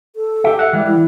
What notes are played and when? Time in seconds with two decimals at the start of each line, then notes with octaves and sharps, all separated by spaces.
0.16 A4
0.44 G4 E5
0.59 E5 F#5
0.73 E3 G3 G#3
0.87 E4